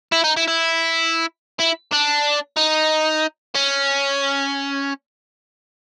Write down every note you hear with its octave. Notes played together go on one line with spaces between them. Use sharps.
E4
D#4
E4
E4
E4
D4
D#4
C#4